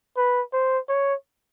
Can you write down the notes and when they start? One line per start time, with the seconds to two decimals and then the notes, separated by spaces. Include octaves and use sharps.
0.17 B4
0.53 C5
0.89 C#5